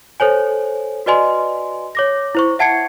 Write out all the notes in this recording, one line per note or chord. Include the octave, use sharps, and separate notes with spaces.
A4 C5 C#5 G#5
F#4 B4 D5 D#5 G#5 C6
C#5 D6 A#6
E4 C5 C#6
E5 F#5 A5 G#6 C7 C#7